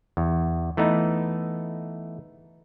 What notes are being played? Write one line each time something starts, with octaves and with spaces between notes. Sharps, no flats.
E2
E3 A3 B3 D#4